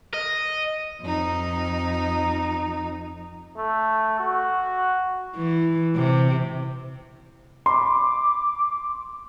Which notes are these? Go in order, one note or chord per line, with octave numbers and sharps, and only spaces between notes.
D#5
F2 D#4
A3
F#4
E3
C3
B5 C6 D6